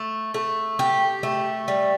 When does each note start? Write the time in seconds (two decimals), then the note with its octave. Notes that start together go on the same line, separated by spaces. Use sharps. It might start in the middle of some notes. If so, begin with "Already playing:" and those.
Already playing: A3
0.34 A3
0.79 G4
1.23 A3
1.68 G3